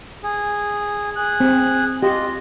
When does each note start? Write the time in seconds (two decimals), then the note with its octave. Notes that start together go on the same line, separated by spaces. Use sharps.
0.24 G#4
1.16 G#4 F#6
1.40 C4
2.03 F4 G4 D#5